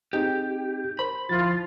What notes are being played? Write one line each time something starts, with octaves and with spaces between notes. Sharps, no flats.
C4 D#4 G4 G#4
A#4 C5 B5
D2 F3 E4 F4 A6